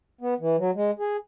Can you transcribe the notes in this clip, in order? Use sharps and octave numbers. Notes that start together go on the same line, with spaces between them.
B3
E3
F#3
G#3
G#4